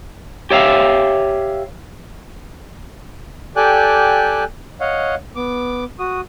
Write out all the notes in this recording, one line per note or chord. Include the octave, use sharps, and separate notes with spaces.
G4 C#5 E5 F5
G4 A4 D5 G5 G#5 F#6
C#5 D#5 F5 F#5
B3 D6
F#4 D#6